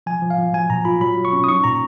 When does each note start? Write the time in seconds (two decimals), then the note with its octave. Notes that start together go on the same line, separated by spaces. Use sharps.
0.06 F3 G#5
0.22 F3
0.30 F5
0.39 F3
0.53 F#3 G#5
0.70 A#2 A#5
0.85 F4 B5
1.01 F#3 B5
1.17 F#3
1.25 C#6
1.33 C#4
1.44 D#6
1.48 D#4 C#6
1.64 A#2 A#5